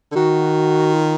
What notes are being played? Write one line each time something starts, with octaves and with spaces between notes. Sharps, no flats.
D3
D#3 F#4
F4